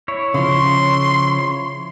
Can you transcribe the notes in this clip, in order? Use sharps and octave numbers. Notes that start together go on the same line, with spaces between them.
E4 C#5
C#3 F3 C6